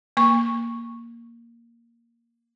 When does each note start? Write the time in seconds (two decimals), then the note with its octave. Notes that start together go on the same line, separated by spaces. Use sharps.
0.17 A#3 C#6